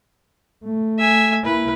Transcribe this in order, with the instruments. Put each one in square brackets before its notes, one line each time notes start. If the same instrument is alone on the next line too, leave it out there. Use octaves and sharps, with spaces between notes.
[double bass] A3
[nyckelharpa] E5 G#5
[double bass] A#3 E4 [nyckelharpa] B4